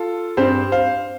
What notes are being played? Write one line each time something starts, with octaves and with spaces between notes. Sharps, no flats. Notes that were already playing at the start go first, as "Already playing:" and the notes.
Already playing: F4 A4
G2 G3 C4 G4 C5
C5 F5